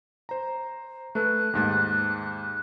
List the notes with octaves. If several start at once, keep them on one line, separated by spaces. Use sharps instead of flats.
C5 A#5
A3 A4 B4 F#6
D#2 G#2 A6